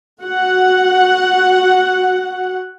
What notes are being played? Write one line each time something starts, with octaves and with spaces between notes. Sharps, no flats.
F#4 F#5